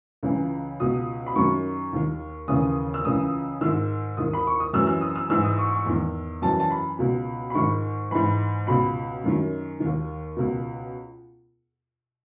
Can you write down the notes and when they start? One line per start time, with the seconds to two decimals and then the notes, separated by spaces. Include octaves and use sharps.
0.23 C#2 C#3 E3
0.80 C#2 B2 D#6
1.26 B5
1.36 F#2 D#3 C#6
1.93 D#2 D#3
2.48 D#2 C#3 E3 D#6
2.94 E6
3.05 C#2 C#3 E3 D#6
3.61 G#2 D#3 E6
4.17 D#2 D#3 D#6
4.33 B5
4.47 C#6
4.60 D#6
4.73 F#2 E3 E6
4.87 E6
5.01 D#6
5.16 E6
5.29 G#2 E3 E6
5.44 D#6
5.58 C#6
5.72 C#6
5.86 E2 D#3
6.42 F#2 E3 A5
6.60 A5
6.71 B5
6.99 C#2 B2
7.50 B5
7.55 G#2 D#3 C#6
8.11 G#2 E3 B5
8.67 C#2 B2 B5
9.24 F#2 D#3
9.80 D#2 D#3
10.37 C#2 B2